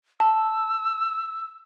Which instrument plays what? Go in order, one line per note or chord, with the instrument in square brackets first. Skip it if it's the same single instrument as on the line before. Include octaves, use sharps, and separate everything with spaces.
[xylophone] A5 [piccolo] E6